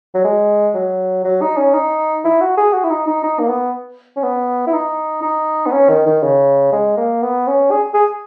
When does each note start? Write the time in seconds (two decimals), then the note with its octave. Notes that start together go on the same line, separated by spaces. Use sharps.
0.14 F#3
0.24 G#3
0.74 F#3
1.24 F#3
1.41 D#4
1.57 C#4
1.74 D#4
2.24 E4
2.41 F#4
2.57 G#4
2.73 F#4
2.84 E4
2.90 D#4
3.07 D#4
3.23 D#4
3.39 A#3
3.48 B3
4.16 C#4
4.23 B3
4.67 E4
4.73 D#4
5.22 D#4
5.66 B3
5.72 C#4
5.89 D#3
6.06 D#3
6.23 C#3
6.72 G#3
6.97 A#3
7.22 B3
7.47 C#4
7.71 G#4
7.94 G#4